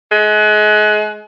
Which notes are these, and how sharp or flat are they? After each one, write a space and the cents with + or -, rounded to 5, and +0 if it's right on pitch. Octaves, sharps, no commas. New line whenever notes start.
G#3 +35